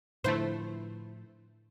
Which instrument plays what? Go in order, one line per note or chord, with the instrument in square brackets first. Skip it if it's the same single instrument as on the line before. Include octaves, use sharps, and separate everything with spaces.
[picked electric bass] A2 D3 F3 [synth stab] A3 C5 [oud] E4 B4